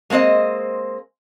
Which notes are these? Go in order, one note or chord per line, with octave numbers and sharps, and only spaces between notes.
G#3 A#3 C4 C5 D#5